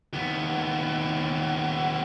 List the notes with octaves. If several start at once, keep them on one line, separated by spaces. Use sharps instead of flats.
D#2 B3